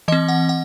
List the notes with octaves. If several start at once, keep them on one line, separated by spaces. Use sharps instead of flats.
E3 C4 D#5
F#5
F#5